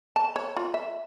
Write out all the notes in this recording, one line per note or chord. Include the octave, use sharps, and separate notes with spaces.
A5
C#5
F4
E5